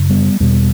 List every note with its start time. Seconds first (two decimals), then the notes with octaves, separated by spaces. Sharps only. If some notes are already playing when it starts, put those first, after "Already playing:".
Already playing: F#2 C#3
0.09 G3 B3
0.40 E2 B2 G3 B3